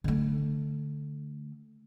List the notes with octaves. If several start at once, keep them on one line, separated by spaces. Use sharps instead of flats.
D3 A3